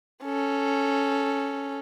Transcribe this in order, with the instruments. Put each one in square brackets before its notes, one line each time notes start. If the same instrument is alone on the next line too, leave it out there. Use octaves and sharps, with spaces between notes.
[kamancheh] C#4 A4